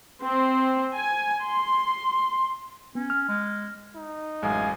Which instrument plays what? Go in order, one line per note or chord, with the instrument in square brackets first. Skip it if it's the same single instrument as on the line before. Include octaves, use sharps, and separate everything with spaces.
[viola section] C4
G#5
C6
[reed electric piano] B3 [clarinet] C#4
[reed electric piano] F6
[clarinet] G#3
[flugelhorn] D#4
[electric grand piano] A1 F#2 G#3 [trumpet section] D#5 F5 G#5